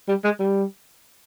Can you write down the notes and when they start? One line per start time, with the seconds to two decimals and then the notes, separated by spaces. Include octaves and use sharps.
0.09 G3
0.24 G#3
0.40 G3